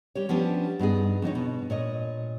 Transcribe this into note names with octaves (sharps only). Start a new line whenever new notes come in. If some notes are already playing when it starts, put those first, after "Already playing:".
G3 G4 C#5
F3 B3 C#4 D4 G4
G2 B3 D#4 G#4
F2 D3 D#4 C#5
B2
A#2 C#5 D#5